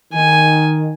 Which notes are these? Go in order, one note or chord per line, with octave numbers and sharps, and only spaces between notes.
D#3 G#5